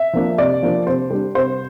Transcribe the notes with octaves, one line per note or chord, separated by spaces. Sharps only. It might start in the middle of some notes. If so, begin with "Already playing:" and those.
Already playing: E5
F3 A#3 D4
C3 D5
F3 A#3 D4
C3 C5
G3 D4
C3 C5